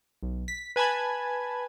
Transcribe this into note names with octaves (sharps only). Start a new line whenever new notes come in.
B1
B6
B4 G#5 A5 B5 G#6